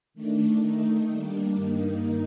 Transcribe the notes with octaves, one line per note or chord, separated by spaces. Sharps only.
D#3 A3 D4
D#3 A3 D#4
D#3 G3 A#3 D4
G2 D#3 A#3 D#4